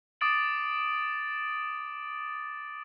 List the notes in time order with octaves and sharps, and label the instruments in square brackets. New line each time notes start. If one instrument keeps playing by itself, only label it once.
[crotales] D6 D#6 A6 D7 F#7